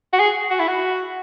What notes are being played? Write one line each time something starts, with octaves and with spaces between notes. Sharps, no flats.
F#4
G#4
F#4
E4
F#4